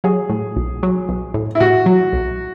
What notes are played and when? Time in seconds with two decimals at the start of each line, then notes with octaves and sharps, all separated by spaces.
0.04 F#3 G#4
0.30 A2
0.56 B1
0.83 F#3
1.09 B1
1.34 A2
1.55 E4
1.60 A2 F#4
1.86 F#3
2.13 B1